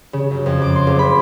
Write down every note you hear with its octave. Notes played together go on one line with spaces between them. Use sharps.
C#3
F#2
F2
D6
C6
F#1
B5